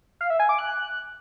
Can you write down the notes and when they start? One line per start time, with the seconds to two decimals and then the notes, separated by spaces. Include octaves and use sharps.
0.21 F5
0.30 E5
0.40 G#5
0.49 D6
0.59 F#6